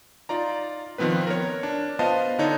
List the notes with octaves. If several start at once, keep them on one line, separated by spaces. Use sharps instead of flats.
D#4 F4 D5 A#5
D#3 F3 B3 C4 B4
A#4 C#5
D4
B3 F4 C5 D#5 F5 A5
D3 D4 D#4 C#5